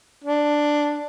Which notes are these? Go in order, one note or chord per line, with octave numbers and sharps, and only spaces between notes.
D4